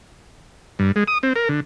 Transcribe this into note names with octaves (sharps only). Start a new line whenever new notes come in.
G2
G#3
D#6
C4
A#4
D3